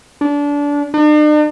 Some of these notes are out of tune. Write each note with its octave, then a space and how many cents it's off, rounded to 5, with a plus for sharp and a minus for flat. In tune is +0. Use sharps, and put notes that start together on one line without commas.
D4 -25
D4 +45